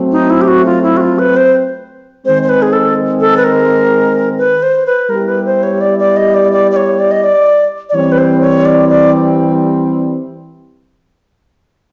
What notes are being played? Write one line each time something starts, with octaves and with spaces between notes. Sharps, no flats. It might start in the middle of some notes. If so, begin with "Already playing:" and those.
Already playing: F#3 A3 C4
D#4
E4
G4
F#4
F4
E4
F#4
F4
B4
C5
D#3 G#3 C4 C5
C5
B4
G#4
A4
A4
B4
A#4
B4
C5
B4
G3 B3 E4 G4 A#4
B4
C5
C#5
D5
D5
D#5
D5
D5
D5
C#5
D5
D#5
D5
D5
E3 G3 C4 C#5
B4
C5
C#5
D5
D5